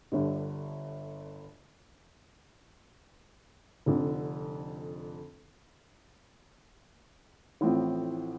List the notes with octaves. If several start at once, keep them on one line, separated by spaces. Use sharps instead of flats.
G1 G2 D3
F1 F2 D3
A1 A2 F3 C4